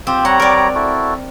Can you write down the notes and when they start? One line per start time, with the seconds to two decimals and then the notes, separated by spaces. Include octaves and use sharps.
0.07 C4 F4 G4 C5
0.25 G3 C#5 F#5 A#5
0.40 A#4 D5
0.75 E4 F#4 A4